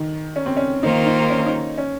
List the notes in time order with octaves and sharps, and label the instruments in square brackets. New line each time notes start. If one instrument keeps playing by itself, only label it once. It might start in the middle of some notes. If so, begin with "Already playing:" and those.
Already playing: [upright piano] D#3
C#4
C4
C#4
[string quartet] D#3 A#3 F4 C5 [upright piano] D#4
[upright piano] D#4
C#4
D#4
C#4